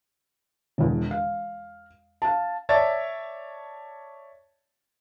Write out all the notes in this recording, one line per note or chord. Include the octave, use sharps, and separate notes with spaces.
E1 E2
F5
F5 A5
C#5 D5 E5 A5 A6